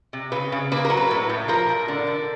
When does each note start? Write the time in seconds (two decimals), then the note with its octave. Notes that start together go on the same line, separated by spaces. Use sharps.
0.13 C3
0.32 C#3 B4
0.52 C#3
0.72 A#3 B4
0.85 A#4
0.90 F#3
0.97 B4
1.10 A2
1.29 A2
1.48 F3 A#4
1.69 A2
1.88 D3
2.07 D3